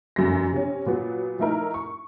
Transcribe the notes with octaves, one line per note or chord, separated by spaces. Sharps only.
F1 F#2 A#6
C3 C#4
A#2 F#3 B3
F3 A3 D#4 E4 A#4
C#6